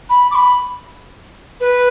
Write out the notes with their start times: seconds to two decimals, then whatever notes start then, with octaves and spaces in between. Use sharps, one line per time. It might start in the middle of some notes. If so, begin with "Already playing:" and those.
0.09 B5
0.31 D6
0.35 B5
1.60 B4